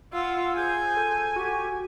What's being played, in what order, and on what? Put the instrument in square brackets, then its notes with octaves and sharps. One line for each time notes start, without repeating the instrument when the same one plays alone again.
[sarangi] F4 [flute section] F5 F#5 E6
[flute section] G#4 C5 G6 [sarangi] G#5
[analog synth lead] A4
[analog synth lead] F#4 [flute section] G4